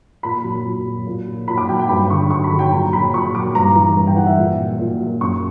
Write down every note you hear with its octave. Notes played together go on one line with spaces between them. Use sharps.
A#2 B5
F#3
A#2
F#3
A#2
F#3
A#2 B5
D6
F#3 G5
G5
G2 B5
D3 F#3 C#6
G2 C#6
B5
D3 F#3
G5
A#2 A#5
F#3 B5
A#2 C#6
F#3 D6
G2 A#5
E3
G2
G5
E3 F#5
E5
A#2
F#3
A#2
F#3
F#2 C#6